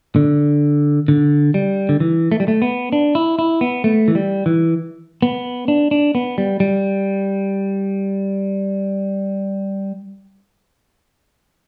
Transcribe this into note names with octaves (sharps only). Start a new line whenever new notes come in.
D3
D3
G3
D3
E3
A3
G3
A3
B3
D4
E4
E4
B3
A3
E3
G3
E3
B3
D4
D4
B3
G3
G3